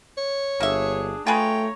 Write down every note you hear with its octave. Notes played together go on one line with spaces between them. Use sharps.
C#5
G1 A#3 D4 G#4 E5
A3 F4 G#4 B4 C#5 G5 A#5